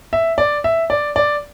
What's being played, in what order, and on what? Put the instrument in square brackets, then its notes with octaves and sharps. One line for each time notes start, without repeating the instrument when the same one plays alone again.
[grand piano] E5
D5
E5
D5
D5